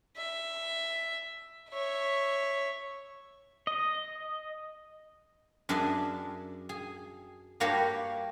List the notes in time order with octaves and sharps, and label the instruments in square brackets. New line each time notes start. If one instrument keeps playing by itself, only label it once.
[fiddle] E5
C#5 E5
[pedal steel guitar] D#5
[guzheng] F#2 D4 G#4 D5 E5 A5
G#4
G2 A#3 F#4 G4 C#5 B5